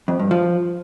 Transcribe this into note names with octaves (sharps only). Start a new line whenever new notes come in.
F2
G2
F3